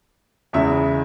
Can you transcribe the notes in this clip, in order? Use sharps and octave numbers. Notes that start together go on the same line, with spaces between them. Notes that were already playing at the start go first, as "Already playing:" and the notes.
E2 C#3 G#3 E5